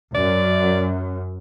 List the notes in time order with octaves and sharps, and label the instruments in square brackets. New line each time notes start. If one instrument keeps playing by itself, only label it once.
[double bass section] F#2 [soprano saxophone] D5